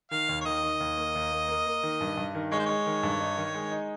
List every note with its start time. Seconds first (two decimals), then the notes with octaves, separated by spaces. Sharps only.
0.11 D#3 F5
0.29 D#2
0.41 C#5
0.46 D#3 D#5
0.63 D#3
0.80 D#2
0.97 A#3
1.15 D#2
1.31 A#3
1.48 A#3
1.66 A#3
1.83 D#3
2.01 G2
2.17 G2
2.35 D#3
2.52 G#3 C#5
2.59 C5
2.66 G#3 C#5
2.86 D#3
3.03 G2
3.20 D#4
3.38 D#3
3.54 G#3
3.72 D#4